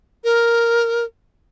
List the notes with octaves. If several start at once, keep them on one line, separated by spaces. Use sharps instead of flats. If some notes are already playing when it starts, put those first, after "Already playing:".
A#4